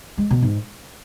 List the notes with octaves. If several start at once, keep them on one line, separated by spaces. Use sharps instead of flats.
G#3
B2
G#2